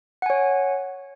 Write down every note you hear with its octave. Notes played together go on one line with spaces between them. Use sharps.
C#5 F#5 G#5